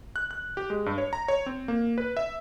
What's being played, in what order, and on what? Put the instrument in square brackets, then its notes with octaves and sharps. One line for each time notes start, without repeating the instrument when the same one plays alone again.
[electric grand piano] F#6
F#6
G4
G#3
G2
C#5
A#5
C#5
C4
A#3
B4
E5